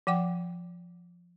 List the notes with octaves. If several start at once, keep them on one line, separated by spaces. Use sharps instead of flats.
F3 F#5 G5 D6